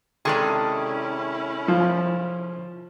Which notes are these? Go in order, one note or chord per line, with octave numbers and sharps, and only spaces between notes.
C3 D#3 G#3 C#4 E4 G#4 A4 D5
F3